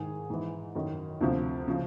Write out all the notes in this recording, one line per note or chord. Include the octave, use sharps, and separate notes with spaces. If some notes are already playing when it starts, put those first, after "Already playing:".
Already playing: G#2 D#3 G#4
G#2 E3
F#2 D#3
D2 C3 F3
C#3 F3